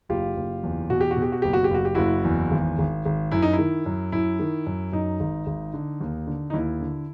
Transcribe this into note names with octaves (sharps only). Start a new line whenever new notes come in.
F#1 F4 G4
F#1
E2
B2 F#4
G4
F#4
B2
G4
F#4
F#1 G4
F#4
G4
F#1 F#4
G4
F#1 E4 F#4
E2
G#1
G#1
G#1
F#2 E4
D#4
E4
D#3
F#2
F#2 E4
D#3
F#2
F#2 D#4
G#1
G#1
D3
D#2
D3
D#4
D#2 E4
D3